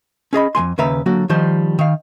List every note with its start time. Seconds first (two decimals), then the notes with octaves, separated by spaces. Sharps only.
0.33 C#4 G#4 D#5 B5
0.55 F2 A3 G#5 C6
0.78 D#2 C#3 B4 E5 A#5
1.06 D3 F#3 A#3 F#4
1.29 D#3 F3 G3 C5
1.79 D#3 F5